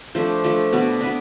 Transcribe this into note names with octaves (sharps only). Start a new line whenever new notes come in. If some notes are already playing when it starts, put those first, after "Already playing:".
F3 A3 D4 C5
F3 A3 D4
B2 B3 D4
B3 D4